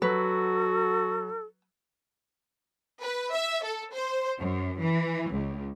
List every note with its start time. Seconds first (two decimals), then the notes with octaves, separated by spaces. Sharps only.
0.02 F#3 F#4 A4 B4
3.01 B4
3.32 E5
3.63 A4
3.93 C5
4.40 F#2
4.80 E3
5.32 C#2